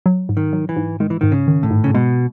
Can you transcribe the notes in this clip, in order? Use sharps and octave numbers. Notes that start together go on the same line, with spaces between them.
F#3
G#2
D#3
F#3
E3
G#2
D#3 G#3
E3
G#2 D#3
C#3
D#3
A2
G#2
C#3
B2 G#3